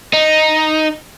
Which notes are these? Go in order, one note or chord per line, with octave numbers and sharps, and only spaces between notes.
D#4